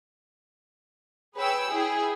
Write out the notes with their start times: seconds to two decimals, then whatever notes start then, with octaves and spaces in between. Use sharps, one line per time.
1.36 G#4 B4 C#5 G5 E6
1.71 E4 G#4 G5